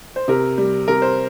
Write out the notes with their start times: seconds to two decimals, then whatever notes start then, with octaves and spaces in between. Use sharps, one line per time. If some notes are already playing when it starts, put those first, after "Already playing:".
0.16 C5
0.28 C3 A#4
0.58 G3
0.88 C3 A#4
1.02 C5